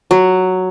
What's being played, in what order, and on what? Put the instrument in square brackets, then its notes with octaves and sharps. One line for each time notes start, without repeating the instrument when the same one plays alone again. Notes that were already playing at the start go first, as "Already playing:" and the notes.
[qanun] F#3